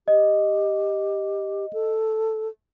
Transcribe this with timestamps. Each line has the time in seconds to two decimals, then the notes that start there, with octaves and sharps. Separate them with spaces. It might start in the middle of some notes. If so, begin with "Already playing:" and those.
0.08 G4 D#5
1.73 A4